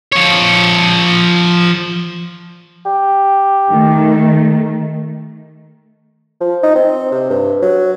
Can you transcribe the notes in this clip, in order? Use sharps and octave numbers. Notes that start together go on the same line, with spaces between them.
F3 C#5
G4
D#3 A3
F3
D#4
C4
C3
G2
F#3